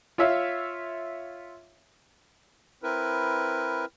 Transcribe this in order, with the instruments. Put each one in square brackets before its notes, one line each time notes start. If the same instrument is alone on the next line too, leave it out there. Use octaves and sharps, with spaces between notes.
[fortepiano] F4 C#5 E5 F5
[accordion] C4 E4 A#4 B4